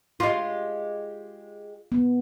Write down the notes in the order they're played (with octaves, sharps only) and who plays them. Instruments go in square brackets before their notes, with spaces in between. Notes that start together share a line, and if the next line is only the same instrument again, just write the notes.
[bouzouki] G#3 G4 [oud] F4
[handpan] B3